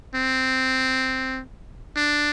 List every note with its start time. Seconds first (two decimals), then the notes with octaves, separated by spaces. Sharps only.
0.15 C4
1.97 D4